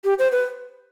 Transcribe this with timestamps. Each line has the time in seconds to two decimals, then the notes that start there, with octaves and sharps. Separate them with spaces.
0.04 G4
0.19 C5
0.32 B4